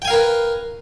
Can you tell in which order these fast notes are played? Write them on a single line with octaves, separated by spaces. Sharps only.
G5 G#5 F5 A#4 B4